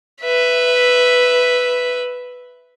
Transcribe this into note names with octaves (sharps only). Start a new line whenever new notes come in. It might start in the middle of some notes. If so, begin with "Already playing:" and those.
B4 E5